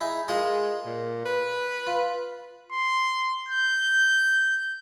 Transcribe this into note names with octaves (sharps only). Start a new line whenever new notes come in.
D#4 E4 G#4
G#3 F4 G#4 A#4
A#2
B4
F4
C6
G6